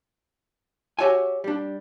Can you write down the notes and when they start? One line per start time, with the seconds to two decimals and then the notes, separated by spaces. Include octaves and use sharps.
0.99 F#4 G4 C#5 E5 F#5 G#5
1.44 G3 D4